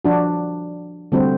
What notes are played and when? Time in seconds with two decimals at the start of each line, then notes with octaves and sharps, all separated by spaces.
0.05 F3 D4 F#4
1.12 D3 G3 A3 C4 F#4